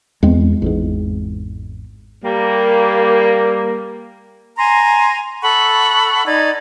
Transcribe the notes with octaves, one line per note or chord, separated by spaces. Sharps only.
E2 G#3 C4
G#1 E2 G#2
G3 A#3
G#5 A#5 C6
A4 F#5 B5 C#6
D#4 D5 G#6